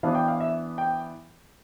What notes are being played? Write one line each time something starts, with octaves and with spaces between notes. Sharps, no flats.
E3 B3 D4 F5
G5
F5
E5
G5